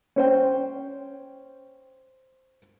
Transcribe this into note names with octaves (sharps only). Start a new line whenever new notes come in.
C#4 C5 G5